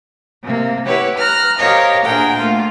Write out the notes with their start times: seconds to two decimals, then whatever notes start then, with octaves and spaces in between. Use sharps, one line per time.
0.43 C3 A#3
0.85 E4 G4 B4 C#5 F#5
1.17 A#5 F6 F#6
1.58 G4 A#4 C5 C#5 D#5 F5
2.03 D2 A#2 G#4 A#4 F#5 G5
2.38 A3 A#3 F4